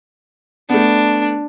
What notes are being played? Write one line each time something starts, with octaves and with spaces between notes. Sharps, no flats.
A3 B3 D4